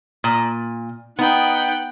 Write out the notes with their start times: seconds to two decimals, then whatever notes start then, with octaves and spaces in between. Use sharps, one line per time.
0.24 A#2
1.19 B3 D#4 F#5 G5